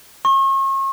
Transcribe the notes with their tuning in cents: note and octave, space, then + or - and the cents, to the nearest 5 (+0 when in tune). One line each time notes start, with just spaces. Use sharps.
C#6 -40